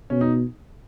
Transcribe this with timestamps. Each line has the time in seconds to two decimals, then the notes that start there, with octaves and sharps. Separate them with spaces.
0.10 B2 C#4
0.21 D#4